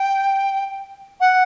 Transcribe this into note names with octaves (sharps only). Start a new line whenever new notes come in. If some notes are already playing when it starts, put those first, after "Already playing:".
Already playing: G5
F#5